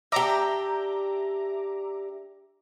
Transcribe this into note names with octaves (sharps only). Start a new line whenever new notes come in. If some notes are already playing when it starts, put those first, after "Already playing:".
D4 G4 E5 A#5 D6